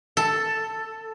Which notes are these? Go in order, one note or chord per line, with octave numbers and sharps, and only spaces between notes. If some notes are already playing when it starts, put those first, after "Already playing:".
A4